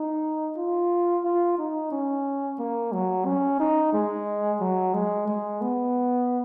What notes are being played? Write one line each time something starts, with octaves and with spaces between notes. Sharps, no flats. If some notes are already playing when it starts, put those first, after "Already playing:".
Already playing: D#4
F4
F4
D#4
C#4
A#3
F#3
C#4
D#4
G#3
F#3
G#3
G#3
B3